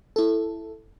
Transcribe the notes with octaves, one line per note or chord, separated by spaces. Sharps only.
E4 A4